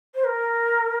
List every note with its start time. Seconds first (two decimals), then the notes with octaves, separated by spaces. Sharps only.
0.15 C5
0.24 A#4